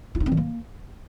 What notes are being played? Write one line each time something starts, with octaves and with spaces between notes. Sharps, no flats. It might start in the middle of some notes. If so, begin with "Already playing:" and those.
E4
D#4
C4
E3
A#3